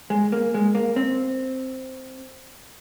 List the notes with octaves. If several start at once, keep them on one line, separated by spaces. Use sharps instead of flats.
G#3
A#3
G#3
A#3
C4